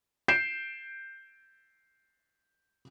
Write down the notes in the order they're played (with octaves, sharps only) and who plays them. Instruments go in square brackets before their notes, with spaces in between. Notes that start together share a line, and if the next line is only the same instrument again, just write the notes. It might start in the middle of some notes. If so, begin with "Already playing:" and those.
[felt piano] G6 C7 D7 E7